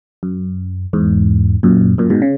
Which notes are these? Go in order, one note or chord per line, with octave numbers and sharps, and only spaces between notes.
F#2
E2 G#2
F#2 A#2
F#2 A#2
G#2 B2
C#3